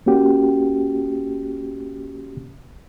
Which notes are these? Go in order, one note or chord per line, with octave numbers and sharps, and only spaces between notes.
A#3 C#4 F#4 G4